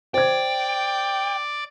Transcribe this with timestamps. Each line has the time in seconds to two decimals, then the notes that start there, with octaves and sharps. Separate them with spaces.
0.14 C5 D5 G5 G#6